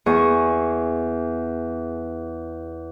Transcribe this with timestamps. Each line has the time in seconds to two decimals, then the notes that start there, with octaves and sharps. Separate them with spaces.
0.06 E2 G#4 C#6